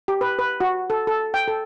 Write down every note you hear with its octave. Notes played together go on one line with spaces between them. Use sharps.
G4
B4
B4
F#4
A4
A4
G5
A4